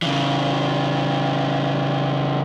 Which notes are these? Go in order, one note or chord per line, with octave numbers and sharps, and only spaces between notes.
C#3 E3